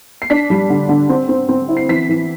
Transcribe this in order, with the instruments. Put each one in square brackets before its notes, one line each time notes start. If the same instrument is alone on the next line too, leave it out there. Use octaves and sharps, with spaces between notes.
[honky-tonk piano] C7
D4 B6
G3
D3
D3
C4
C4
C4
E4
C7
E3 B6
E3